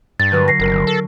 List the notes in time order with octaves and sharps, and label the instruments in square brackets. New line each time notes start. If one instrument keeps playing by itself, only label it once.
[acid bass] G2 [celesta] A6
[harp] D3 F#3 A#4 [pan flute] B4
[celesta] A#6 C7
[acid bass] G1 [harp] C#2 F#4 [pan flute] A#4
[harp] D3
[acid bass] A4